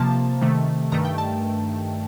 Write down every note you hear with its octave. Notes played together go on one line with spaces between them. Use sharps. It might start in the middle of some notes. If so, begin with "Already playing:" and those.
Already playing: C3 F3 A#3 A5
C3 D#3 A3
G2 D#3 A3 A#5
G5
A5